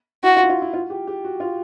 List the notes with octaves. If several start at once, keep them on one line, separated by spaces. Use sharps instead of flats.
E4 F#4
F4
E4
F4
E4
F4
G4
G4
F#4
F4